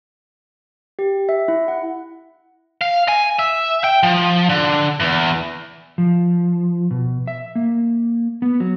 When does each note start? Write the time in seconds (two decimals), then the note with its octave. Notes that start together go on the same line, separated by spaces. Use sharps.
0.99 G4
1.29 E5
1.48 E4
1.68 F#5
2.81 F5
3.08 G#5
3.39 E5
3.84 G5
4.03 F3
4.49 D3
5.00 E2
5.98 F3
6.91 B2
7.27 E5
7.55 A#3
8.42 B3
8.60 F#3